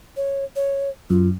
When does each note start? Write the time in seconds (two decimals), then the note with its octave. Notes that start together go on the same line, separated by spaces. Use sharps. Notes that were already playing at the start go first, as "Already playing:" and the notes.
0.17 C#5
0.56 C#5
1.10 F#2 F4